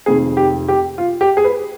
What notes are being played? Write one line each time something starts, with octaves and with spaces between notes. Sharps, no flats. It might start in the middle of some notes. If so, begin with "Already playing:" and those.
F1 F2 D#3 G#4
G4
G4
F4
G4
G#4
B4